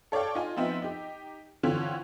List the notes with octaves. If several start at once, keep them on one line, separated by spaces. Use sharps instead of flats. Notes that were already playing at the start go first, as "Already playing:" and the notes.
A4 C#5 D5 F5 G5
D#4 F4 G#5
F3 B3 C4 D#4 E5
D#4 G4
D3 E3 C4 C#4 F4